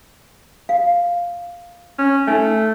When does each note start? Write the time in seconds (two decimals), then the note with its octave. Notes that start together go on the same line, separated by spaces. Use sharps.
0.69 F5
1.99 C#4
2.27 A3 D#4 G#5